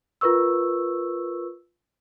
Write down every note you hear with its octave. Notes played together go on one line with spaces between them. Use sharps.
F4 A#4 B4 C#6 E6